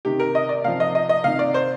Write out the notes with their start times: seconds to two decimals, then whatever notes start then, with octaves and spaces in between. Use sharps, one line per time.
0.05 C3 D#3 G4
0.20 A#4
0.35 D#5
0.49 D5
0.64 C3 F3 F5
0.80 D#5
0.95 D#5
1.09 D#5
1.24 C3 D#3 F5
1.39 D5
1.54 C5